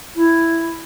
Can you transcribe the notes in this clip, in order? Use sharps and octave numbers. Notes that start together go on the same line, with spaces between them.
E4